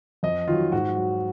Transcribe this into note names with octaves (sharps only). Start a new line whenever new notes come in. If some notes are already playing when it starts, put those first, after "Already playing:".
F2 D#5
D#3 F#3 F4
G#2 F#4
F#3